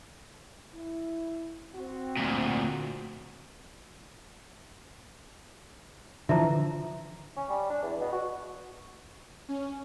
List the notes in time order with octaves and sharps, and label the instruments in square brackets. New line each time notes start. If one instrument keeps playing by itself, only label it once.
[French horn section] E4
C4 F#4
[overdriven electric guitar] D2 A#2
[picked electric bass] D3 E3 F3 [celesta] E5 A5 A#5
[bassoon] C#4
G3
D4
E2
B2
F#4
[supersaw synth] C#4